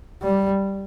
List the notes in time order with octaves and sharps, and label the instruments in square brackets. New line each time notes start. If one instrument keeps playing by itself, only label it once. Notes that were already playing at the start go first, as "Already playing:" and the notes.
[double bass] G3